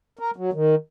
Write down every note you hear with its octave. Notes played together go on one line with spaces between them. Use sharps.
A#4
F#3
D#3